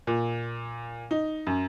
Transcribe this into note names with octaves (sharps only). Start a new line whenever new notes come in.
A#2
D#4
F#2